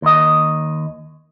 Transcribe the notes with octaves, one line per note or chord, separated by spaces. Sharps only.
D#2 D#5